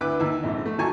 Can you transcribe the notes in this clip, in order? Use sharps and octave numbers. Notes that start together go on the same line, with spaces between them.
D2 B3 E4 B4 D6 F#6
D#2 E5
A#1 F2 G#2
A3
D#2 F#3 G#5 A5 C#6